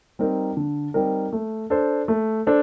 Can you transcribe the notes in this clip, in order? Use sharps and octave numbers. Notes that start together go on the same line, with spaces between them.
G3 C4 D#4 A#4
D3
G3 C4 D#4 A#4
A3
D4 A4 C5
A3
D4 A4 C5